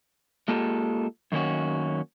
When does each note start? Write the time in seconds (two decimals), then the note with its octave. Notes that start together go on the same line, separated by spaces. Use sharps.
0.48 G#3 A#3 F4 G4 A4
1.32 F#2 D#3 A#3 C#4 F#4